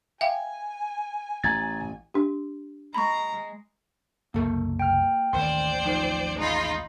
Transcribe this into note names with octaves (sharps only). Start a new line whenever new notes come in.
E5 F5 G5 G#5
A1 A#5 G#6 A6
D4 G4
G#3 A#5 B5 C#6
F#1 C2 A#3 A4
G5 F6
A1 D#2 D#3 C5 D5 C6
F3 D#4
G#2 D#4 F4 B5